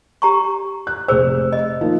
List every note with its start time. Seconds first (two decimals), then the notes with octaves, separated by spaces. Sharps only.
0.22 G4 A#5 C#6
0.87 F#6
1.08 F1 G#4 C5 E6
1.52 D#5
1.81 F3 A#3 D#4